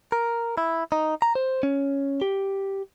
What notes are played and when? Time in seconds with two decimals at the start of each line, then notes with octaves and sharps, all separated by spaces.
0.12 A#4
0.58 E4
0.92 D#4
1.22 A#5
1.35 C5
1.63 C#4
2.22 G4